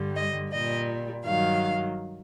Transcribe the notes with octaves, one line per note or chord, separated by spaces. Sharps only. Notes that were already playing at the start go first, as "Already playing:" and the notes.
Already playing: G2 D3 G3
D#5
A#2 G3 D#5
G2 D#3 F#3 F5